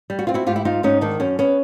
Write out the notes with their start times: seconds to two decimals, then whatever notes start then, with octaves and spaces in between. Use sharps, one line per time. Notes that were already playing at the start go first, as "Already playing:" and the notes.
0.10 G3
0.19 F#4
0.27 C4 F4
0.34 E4 F#4
0.47 G#2 F4 G4
0.56 E4
0.65 G#2 D#4 F4
0.83 G#2 C#4 D#4
1.01 D#3 D4
1.20 F#2 C#4
1.39 B3 C#4